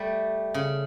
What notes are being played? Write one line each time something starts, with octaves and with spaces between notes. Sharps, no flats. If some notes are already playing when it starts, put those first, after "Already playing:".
Already playing: G3 A3
C#3